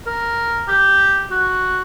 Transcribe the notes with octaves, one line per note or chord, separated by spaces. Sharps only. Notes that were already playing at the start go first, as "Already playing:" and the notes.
A#4
G4
F#4